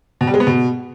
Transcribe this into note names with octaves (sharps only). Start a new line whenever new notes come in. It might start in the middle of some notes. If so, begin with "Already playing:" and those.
B2
G3
G#3
B3
B2